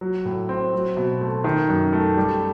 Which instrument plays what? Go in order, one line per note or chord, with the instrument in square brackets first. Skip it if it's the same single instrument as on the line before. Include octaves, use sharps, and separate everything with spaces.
[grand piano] F#3
A2
C4
F#3
B2
A3
D#3
F#2
A3
G3